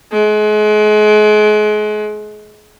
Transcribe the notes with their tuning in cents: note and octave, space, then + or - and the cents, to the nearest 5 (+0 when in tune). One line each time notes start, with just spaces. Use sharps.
G#3 +35